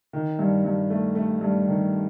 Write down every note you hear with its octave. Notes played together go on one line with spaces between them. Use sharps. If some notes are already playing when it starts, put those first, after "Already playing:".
D#3
G2
G2
A3
A3
G2
D#3